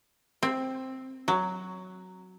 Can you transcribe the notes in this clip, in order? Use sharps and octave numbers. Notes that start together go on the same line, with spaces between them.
C4
F#3